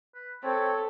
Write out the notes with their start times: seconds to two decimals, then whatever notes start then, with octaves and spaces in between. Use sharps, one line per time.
0.15 B4
0.44 C4 A4 C#5